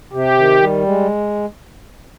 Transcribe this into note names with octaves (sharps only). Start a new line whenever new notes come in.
C3 G4
D#3
G3
G#3